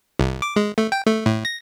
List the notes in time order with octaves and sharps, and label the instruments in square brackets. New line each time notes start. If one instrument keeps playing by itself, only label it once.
[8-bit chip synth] C2
D6
G#3
A3
G5
A3
A2
A#6